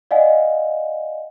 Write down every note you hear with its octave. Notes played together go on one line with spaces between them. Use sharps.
D5 D#5 F5 F#5 G#5